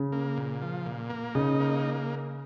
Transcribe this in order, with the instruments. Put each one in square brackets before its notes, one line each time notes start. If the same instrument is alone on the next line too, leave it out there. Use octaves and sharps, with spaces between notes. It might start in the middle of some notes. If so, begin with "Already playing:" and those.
Already playing: [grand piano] C#3
[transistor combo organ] A#3
A#2
F3
A#2
A#3
[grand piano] C#3 [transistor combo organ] D#4
[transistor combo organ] A#3